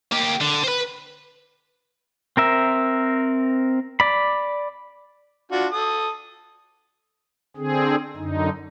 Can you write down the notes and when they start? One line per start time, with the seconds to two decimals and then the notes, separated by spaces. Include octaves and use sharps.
0.12 A#3 G4
0.41 D3
0.64 B4 C5
2.37 C4 A#4 E5
4.00 D5 B5
5.52 D4 F4 F#4
5.72 A4 D#6
7.57 D3 C4 G#4
8.17 F#2 D3 D#4